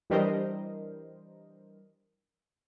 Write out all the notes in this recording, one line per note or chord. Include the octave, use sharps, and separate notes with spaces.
E3 G3 D4 A#4 C5 D#5